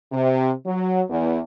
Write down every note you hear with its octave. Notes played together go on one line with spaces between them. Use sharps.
C3
F#3
E2